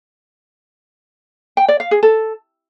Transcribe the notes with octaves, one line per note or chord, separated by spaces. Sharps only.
G5
D5
F5
G#4
A4